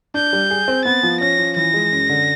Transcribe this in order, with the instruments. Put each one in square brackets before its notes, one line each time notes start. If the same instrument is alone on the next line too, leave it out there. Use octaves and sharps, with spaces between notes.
[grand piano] D4 [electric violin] G6
[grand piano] G3
G#4
C4
[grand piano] B3 [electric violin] A6
[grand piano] F3
[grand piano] C#4 [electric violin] A#6
[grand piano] F3
[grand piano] E3 [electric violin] A#6
[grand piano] G#3
F#2
D3